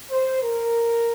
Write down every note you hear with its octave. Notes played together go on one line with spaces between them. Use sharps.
C5
A#4